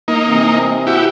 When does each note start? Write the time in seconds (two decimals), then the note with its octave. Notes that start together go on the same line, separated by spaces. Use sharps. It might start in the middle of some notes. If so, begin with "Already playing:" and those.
0.08 A#3 D#4
0.28 C3 E3 C4
0.87 E4 F#4 G4